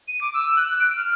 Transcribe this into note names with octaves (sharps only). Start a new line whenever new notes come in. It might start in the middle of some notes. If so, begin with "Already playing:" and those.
D#7
D6
E6
F#6
D7
F6